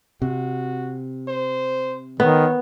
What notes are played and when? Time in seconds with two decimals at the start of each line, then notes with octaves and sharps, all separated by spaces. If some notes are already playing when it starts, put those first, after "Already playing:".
0.22 C3 F#4
1.28 C5
2.20 D#3 B3 C#5